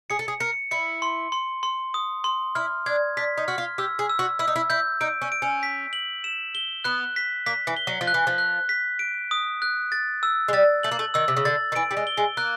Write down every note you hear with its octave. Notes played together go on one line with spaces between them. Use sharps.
G#4 C#7
A4
G#4
A#4 C#7
E4 C#7
C6
C6
C6
D#6
C6
E4 F6
D4 G#6
D4 B6
D#4
F#4 F6
F4
G4 E6
G#4
E6
F#4
E4 E6
D#4
E4
E4 G6
D#4 D7
C#4
D7
C#4
B6
F#7
E7
G7
B3 F#6
B6
A#3 B6
E3
G7
F#3
F3
F#6
E3
F3
F#6
B6
D7
D#6
F#6
A6
E6
G#3
G3 A6
A3 F#7
A#3
A3
D#3 E6
C3
C#3
D3 A6
D#3
E3 D7
G3
G#3
G7
G#3
A#3 F#6